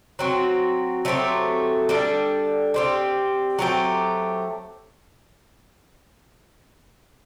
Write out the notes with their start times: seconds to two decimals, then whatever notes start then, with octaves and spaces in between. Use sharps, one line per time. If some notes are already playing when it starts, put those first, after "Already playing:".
0.19 F#3 C4 F#4
1.05 F#3 A3 C4 G4
1.89 G3 D4 A4
2.74 G3 C4 G4
3.59 F#3 A3 C4 G4